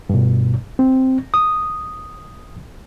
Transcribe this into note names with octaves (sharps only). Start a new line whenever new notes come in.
G2 B2
C4
D#6